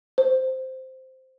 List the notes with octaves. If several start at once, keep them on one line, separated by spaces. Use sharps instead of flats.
C5